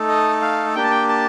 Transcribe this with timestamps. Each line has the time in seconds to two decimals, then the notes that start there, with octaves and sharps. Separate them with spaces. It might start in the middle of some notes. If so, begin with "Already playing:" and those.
Already playing: A3 D#4 A4
0.08 D#5
0.42 F5
0.75 A#3 D4 G4 G5
0.84 A5
0.90 G5
1.09 A5